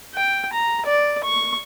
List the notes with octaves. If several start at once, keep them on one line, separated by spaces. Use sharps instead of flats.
G5
A#5
D5
C#6